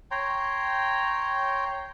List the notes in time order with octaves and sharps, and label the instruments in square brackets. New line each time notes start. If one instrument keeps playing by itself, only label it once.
[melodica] C#5 G5 A#5 C6